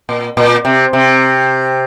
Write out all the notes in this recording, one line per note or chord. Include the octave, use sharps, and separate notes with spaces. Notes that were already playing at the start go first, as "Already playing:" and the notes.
A#2
A#2
C3
C3